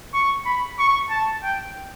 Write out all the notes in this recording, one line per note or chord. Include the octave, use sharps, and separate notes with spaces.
C#6
B5
C#6
A5
G5